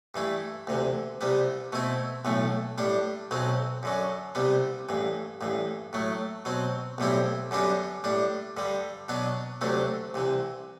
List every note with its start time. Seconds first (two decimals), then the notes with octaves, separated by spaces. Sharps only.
0.14 G2 E3 A3 E4
0.67 D2 C3 E3
1.21 C2 C3 G3 B3
1.72 B2 A3 C4 E4
2.25 B1 A2 E3 A3
2.78 A2 G3 D4
3.31 B1 B2 F#3 C4
3.83 F#2 D3 F#3
4.35 C2 C3 G3 B3
4.89 A1 G2 E3
5.41 A1 G2 E3
5.93 A2 F#3 A3
6.45 B2 F#3 C4
6.98 B1 A2 G3 C4 E4
7.51 F#2 D3 G3 B3 D4
8.04 A2 G3 D4
8.57 G2 D3 G3
9.09 B2 F#3 B3 D4
9.61 D2 C3 F#3 A3 D4
10.14 C2 C3 E3